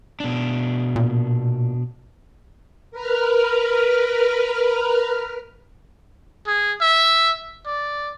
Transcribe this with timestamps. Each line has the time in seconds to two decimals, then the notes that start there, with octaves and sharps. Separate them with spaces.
0.20 B2 D4
0.96 A#2
2.91 A#4 B4 F6
6.47 G#4
6.81 E5
7.66 D5